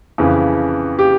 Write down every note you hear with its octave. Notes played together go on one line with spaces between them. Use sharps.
F2 C#3 E3
G4